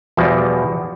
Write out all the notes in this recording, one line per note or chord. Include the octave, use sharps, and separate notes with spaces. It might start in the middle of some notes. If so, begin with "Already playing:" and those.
E2 B2 F3 G3